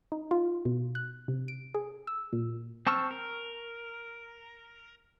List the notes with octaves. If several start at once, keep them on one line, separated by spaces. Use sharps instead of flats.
D#4
F4
B2
F#6
C3
D7
G#4
E6
A#2
C4 A5 C#6 E6 F6
A#4